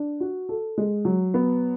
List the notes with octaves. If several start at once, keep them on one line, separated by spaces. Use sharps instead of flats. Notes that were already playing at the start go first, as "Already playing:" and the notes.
Already playing: D4
F#4
A4
G#3
F#3
B3